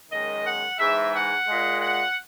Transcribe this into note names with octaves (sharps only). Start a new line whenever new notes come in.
F#2 D#3 G#3 D#5
F#5
G#2 E3 G#3 E5
F#5
A#2 G#3
F#5